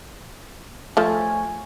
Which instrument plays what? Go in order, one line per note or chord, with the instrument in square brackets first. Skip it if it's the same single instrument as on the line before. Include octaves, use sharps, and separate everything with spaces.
[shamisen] F3 A3 [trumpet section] C#5 G#5